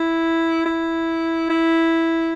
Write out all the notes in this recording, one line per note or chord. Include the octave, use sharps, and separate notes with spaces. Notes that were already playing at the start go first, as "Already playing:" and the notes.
Already playing: E4
E4
E4